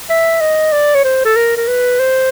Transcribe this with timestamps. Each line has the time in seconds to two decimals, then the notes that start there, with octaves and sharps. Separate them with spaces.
0.10 E5
0.41 D#5
0.72 D5
0.94 C#5
1.04 C5
1.25 A4
1.36 A#4
1.57 A#4
1.68 B4
2.00 C5